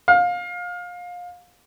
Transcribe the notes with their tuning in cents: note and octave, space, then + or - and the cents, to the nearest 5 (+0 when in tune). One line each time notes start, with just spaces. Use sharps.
F5 +25